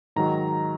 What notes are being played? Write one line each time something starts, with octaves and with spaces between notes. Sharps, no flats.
G#2 D#3 F#3 A#5